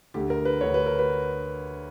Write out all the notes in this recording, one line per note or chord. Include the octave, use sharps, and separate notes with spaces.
D2 D3 G4
A#4
B4
D2 D3 C#5
B4
A#4
B4